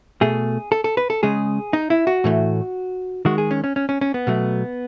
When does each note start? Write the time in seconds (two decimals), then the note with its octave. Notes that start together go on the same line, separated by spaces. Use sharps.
0.21 B2 A3 G#4
0.72 A4
0.84 A4
0.97 B4
1.10 A4
1.23 C#3 G#3 G#4
1.73 D#4
1.90 E4
2.07 F#4
2.24 A2 E3 A3
3.25 D#3 G#3 F#4
3.38 G#4
3.51 C#4
3.64 C#4
3.76 C#4
3.89 C#4
4.01 C#4
4.14 B3
4.27 B2 F#3 A3